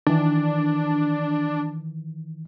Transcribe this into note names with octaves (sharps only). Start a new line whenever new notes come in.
D#3 E3 D4